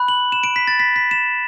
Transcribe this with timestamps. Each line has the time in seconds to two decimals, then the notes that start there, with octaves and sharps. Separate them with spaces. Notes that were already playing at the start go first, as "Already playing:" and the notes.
Already playing: B5 F#6
0.08 F#7
0.32 E7
0.44 D7
0.56 B6
0.67 A6
0.80 B6
0.96 B6
1.11 E7